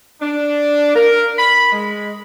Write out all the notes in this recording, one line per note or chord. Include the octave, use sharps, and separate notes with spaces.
D4
A#4
B5
G#3